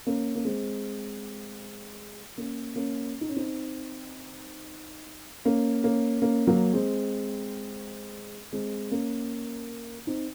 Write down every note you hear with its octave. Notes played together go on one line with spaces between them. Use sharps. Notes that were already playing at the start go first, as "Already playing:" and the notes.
A#3 C#4
A#3
G#3 C4
A#3 C#4
A#3 C#4
D#4
C#4
C4 D#4
A#3 C#4
A#3 C#4
A#3 C#4
F#3 A#3
G#3 C4
G#3 C4
A#3 C#4
C4 D#4